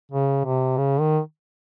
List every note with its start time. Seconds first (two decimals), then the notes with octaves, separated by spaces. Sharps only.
0.12 C#3
0.45 C3
0.77 C#3
1.00 D#3